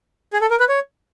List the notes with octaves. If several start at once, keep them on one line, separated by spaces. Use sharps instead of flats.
G#4
A4
A#4
B4
C#5